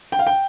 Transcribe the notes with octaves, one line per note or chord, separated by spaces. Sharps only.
G5
F5
G5